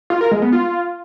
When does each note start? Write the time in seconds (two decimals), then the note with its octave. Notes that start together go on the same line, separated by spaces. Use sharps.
0.10 F4
0.21 A#4
0.31 G#3
0.42 B3
0.53 F4